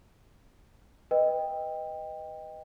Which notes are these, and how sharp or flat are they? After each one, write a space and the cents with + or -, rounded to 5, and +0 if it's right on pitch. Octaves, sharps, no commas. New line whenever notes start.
B4 +0 D#5 +0 G5 +15